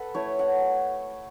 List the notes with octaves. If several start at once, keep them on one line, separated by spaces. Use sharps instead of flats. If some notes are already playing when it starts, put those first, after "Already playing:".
Already playing: A4 B4 F#5
A3 E4 C#5
F#5